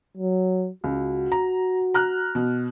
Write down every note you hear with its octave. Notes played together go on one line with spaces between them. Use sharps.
F#3
C#2 F#4
A#5
A#5 F6 F#6
B2